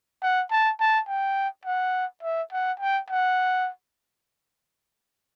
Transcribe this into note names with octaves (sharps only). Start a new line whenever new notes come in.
F#5
A5
A5
G5
F#5
E5
F#5
G5
F#5